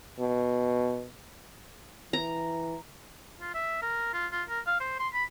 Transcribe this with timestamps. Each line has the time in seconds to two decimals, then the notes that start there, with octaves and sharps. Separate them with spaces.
0.20 B2
2.13 E3 A#5
3.41 F4
3.54 E5
3.82 A#4
4.14 F4
4.32 F4
4.49 A#4
4.67 F5
4.80 C5
5.00 C6
5.14 B5